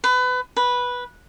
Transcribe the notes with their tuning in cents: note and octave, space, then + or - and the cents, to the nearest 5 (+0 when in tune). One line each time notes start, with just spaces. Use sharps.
B4 +25
B4 -10